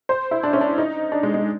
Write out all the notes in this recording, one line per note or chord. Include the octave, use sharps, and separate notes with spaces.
C5
E4
D4
C#4
D4
D#4
D4
G#3
G#3